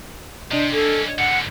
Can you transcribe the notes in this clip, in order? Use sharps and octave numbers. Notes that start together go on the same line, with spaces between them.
C3 D4 D#5
A#3 C#4 A4
G#2 D3 F#5 C#7